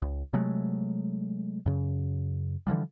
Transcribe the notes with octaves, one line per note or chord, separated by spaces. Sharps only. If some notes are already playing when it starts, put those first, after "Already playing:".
C#2
C3 F#3 G#3 A3
F#2 C#3
D3 E3 F3 G3